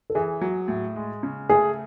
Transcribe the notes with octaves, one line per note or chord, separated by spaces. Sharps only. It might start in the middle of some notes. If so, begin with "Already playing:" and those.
A4
E3 G#4
F#3
A2
G#3
C#3
A3 G#4